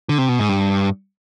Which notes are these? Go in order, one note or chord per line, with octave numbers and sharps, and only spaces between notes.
D3
C3
B2
G#2
G2